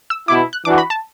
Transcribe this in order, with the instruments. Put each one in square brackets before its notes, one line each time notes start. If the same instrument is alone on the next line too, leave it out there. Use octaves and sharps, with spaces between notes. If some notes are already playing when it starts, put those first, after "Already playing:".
[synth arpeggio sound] E6
[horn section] B2 B3 E4 [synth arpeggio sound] D6
[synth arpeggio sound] F#6
[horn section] E3 D4 F#4 [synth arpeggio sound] D6
[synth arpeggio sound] B5
A5